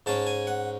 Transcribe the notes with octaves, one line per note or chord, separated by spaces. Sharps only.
G#2 G#3 C#4 A5
G#5
F#5